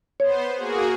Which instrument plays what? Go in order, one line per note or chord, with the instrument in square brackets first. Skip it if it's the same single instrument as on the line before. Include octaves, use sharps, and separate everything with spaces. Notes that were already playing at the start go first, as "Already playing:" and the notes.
[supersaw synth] B3 C5 [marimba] C#5
[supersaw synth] A#3 F#4 G#4